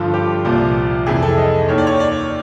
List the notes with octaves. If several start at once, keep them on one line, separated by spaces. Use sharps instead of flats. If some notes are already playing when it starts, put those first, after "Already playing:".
Already playing: G2 D3 F3 F4
G4
C2 A#2 F3
F2 C3 E3 G#4
A4
D#5
D#2 D#3 C#5
D5
C#5
D5